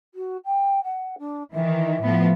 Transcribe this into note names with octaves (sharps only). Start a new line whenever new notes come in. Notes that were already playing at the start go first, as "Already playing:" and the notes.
F#4
G5
F#5
D4
D#3 E3 E5
A2 F3 B3